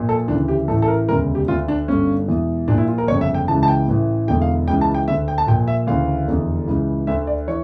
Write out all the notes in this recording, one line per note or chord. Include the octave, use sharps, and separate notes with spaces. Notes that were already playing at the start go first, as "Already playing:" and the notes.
Already playing: A#1 A#2
A4
D2 C#3 E3 D4
G4
A1 A2 E3 A4
A4
A#4
E1 D2 C#3 A#4
G4
D2 D3 F4
D4
G1 G2 D3 C#4
E1 E2 E3
A#1 A#2 D4
E4
F4
A#4
G1 F2 C#3 C#5
E5
G5
C#2 C#3 E3 A5
A5
G5
A1 A2 E3
E1 E2 D3 G5
F5
C#2 C#3 E3 G5
A5
G5
D2 D3 E5
G5
A5
A#1 A#2 G5
E5
D2 C#3 E3 F5
F1 E2 D3
C#2 C#3 E3
D2 D3 E5
D5
E3 C#5